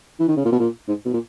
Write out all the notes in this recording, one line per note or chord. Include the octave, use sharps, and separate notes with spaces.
E3
D#3
C#3
A#2
B2
A#2
G#2
B2
A#2